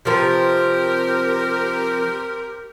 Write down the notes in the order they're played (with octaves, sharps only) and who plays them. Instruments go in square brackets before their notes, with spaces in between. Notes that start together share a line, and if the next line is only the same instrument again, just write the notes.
[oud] C3 F3 B4 [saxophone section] C4 G4 A#4